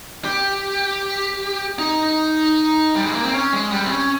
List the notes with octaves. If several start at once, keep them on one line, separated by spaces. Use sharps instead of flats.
G4
D#4
G3
G#3
A#3
C4
C#4
G#3
G3
C4
C#4